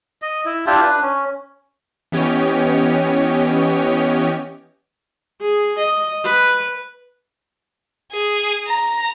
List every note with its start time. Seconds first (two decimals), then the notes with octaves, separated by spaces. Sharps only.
0.22 D#5
0.46 E4
0.67 D4 E4 F4 G4
0.82 D4 B4
1.02 C#4
2.12 E3 B3 C#4 G4 C#5 D#5
5.41 G#4
5.79 D#5
6.25 B4
8.12 G#4
8.68 A#5